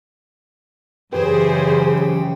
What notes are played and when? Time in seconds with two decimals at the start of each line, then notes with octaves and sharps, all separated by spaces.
1.13 F#2 C#3 E3 G4 G#4 B4 C5 G5